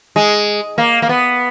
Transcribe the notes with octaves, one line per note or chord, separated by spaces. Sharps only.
G#3
A#3
A#3
B3